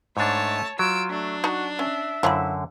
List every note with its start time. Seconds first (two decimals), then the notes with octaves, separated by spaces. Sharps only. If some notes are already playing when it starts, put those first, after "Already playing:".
0.17 G#2 A3 D4 C#5 A5
0.79 F#3 F4 E6 D7
1.11 A3 D4
1.44 D#4 F#4 A5 A#5
1.79 C#4 E5
2.23 F#2 D3 F3 E4 B5